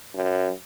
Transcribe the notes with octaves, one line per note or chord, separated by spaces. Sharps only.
F#2